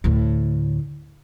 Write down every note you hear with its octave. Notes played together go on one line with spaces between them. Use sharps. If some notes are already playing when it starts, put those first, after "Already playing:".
D2 A2